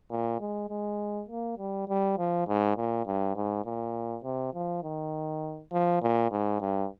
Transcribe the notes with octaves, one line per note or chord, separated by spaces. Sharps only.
A#2
G#3
G#3
A#3
G3
G3
F3
G#2
A#2
G2
G#2
A#2
C3
F3
D#3
F3
A#2
G#2
G2